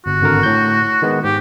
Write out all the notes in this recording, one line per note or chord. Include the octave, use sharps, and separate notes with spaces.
G1 F#4
G#1 D3 A#4
A2 G6
D#3 G#3 B3
G#2 G4